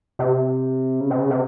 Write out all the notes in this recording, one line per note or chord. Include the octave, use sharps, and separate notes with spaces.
C3
C#3
C3
C#3
C3